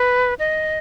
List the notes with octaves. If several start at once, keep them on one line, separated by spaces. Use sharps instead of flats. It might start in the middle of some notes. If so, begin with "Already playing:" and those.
Already playing: B4
D#5